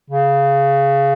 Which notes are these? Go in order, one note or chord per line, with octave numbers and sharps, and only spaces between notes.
C#3